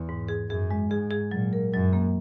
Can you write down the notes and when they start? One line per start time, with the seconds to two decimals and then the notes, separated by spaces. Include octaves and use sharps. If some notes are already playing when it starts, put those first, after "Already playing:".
Already playing: E2
0.09 G#2
0.28 G#4
0.50 F#2 G#4
0.71 G#3
0.90 G#2 G#4
1.11 G#4
1.31 A#2 F#3
1.53 A#4
1.73 F#2 F#3
1.93 A#3